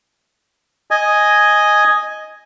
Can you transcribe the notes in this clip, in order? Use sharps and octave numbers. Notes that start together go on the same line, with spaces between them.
D#5 G#5